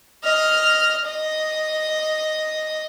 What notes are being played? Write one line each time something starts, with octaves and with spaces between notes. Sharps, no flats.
D#5 F6
D#5